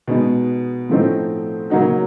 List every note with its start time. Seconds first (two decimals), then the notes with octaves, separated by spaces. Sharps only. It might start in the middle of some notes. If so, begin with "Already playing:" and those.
0.07 B2 G#3 B3 D#4
0.89 A2 F3 A3 C4 D#4
1.70 C#3 F#3 A#3 D#4 F#4